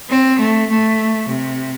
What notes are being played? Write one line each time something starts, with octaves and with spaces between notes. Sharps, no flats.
C4
A3
A3
C3